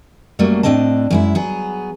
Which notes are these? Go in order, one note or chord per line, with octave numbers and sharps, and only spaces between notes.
F#2 F#3 G3 A3 A#3
A2 C4 D4 D#5 A5
F#2 G#3 E4
F#3 B3 G#4